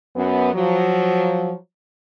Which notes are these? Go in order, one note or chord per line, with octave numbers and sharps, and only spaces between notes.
F#2 B3
F3 F#3